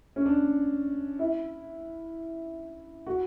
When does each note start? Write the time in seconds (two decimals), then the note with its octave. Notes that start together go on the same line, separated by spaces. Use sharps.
0.16 C#4
0.26 D4
1.19 E4
3.06 F#4